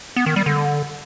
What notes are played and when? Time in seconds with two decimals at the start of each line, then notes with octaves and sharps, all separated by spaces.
0.16 B3
0.26 D#3
0.36 G3
0.46 D3